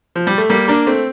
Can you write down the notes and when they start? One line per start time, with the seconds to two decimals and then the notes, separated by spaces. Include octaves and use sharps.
0.16 F3
0.27 G3
0.38 A3
0.50 G3 A#3
0.68 A#3 D4
0.87 A3 C4